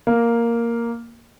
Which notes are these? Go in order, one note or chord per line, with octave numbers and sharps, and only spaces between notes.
A#3